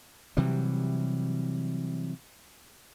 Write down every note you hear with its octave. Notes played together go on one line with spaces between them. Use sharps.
C3 E3 F#3 G3